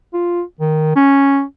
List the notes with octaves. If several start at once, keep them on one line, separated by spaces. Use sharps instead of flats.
F4
D#3
C#4